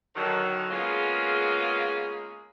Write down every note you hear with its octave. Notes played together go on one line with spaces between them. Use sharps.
D3 D#3 F#3
G#3 A#3 B3 C#4 F4 G#4